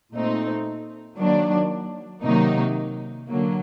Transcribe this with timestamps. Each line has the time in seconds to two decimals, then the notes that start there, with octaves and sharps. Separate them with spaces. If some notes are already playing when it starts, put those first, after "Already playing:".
0.13 A#2 A3 C4 D#4
1.18 D#3 F#3 A#3 D4
2.23 C3 D#3 F#3 A#3 D#4
3.28 D3 F#3 A#3